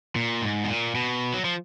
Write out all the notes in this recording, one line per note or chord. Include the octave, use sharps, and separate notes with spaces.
A#2
G#2
B2
A#2
B2
F#3
F3